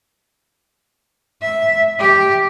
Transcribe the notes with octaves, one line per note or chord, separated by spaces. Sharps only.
E5
G4